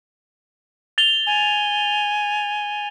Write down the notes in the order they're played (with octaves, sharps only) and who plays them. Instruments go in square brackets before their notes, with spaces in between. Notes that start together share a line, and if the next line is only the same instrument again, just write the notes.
[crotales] A6 F7 G7
[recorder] G#5